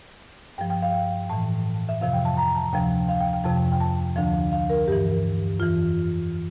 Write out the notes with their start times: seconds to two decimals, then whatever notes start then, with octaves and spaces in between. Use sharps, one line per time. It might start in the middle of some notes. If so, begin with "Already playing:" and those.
0.58 G2 F3 G5
0.70 G5
0.82 F5
0.94 G5
1.29 A2 E3 A5
1.89 E5
2.01 F2 C3 F3 F5
2.13 G5
2.25 A5
2.37 A#5
2.55 A5
2.73 D2 C3 F3 G5
3.09 F5
3.21 G5
3.33 G5
3.44 F2 C3 F3 A5
3.72 G5
3.81 A5
4.16 D2 D3 F3 F5
4.52 F5
4.70 A#4
4.87 G2 E3 G4
5.59 F2 E3 F4